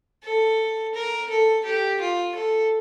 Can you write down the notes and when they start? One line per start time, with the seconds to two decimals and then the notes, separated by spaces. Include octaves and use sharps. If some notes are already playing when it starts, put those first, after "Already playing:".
0.23 A4
0.94 A#4
1.29 A4
1.64 G4
2.00 F4
2.35 A4